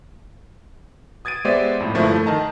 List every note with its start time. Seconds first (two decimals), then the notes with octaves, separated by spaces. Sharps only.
1.25 D#6 G#6 A6 D7 D#7
1.45 G#3 B3 G4 C5 D5 E5
1.80 F2 A2
1.94 G1 G2 F3 A3 E4 A#4
2.12 A3 G6
2.26 D#3 D#5 A5 A#5